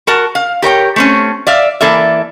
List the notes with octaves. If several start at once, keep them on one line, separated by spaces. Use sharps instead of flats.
F#4 A#4 A5
F5
G4 A#4 C#5 G5
A3 C4 C#4
D5 E5 F5
E3 A#3 A4 D5 E5